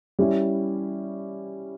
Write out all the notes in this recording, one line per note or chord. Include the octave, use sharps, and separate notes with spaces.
G3 C#4 E4 G4